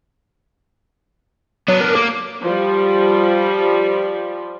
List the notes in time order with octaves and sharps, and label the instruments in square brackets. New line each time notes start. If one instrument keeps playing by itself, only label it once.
[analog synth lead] F#3 [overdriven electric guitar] B3 D4
[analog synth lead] A#4
[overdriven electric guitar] A#3 [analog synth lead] D6
[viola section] F3 G3